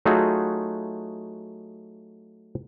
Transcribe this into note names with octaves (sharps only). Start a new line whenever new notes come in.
F#3 A3 D#4 F4 F#4 G#4